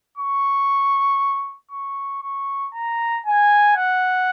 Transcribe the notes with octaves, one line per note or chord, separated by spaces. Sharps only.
C#6
C#6
C#6
A#5
G#5
F#5